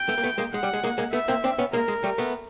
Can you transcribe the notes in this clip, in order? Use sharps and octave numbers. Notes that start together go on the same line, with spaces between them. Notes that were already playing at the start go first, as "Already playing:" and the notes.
Already playing: G5
A3 B3
A#3
A3 B3
G#3 A#3
G#3 F#5
G3
G#3
G#3 A#3
G#3 A#3
A3 B3 E5
A#3 C4
C4 D4
B3 C#4
G#3 A#3 A#4
G#3
G3 A3
A3 B3